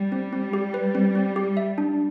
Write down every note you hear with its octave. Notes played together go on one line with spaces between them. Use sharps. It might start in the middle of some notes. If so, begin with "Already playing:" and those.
Already playing: G3
C4
C4
G4
B4
C4
C4
G4
E5
D4